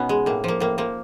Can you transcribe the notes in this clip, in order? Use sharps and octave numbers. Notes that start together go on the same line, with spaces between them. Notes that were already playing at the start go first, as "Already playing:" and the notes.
Already playing: B2 B3 C#4 D#4
G#3
A2 A#3
F3 A#3
A2 A#3
F3 A#3